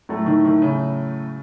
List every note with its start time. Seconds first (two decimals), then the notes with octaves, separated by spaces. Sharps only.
0.09 A2 F#3 A3
0.26 D#3
0.45 D#3
0.62 C#3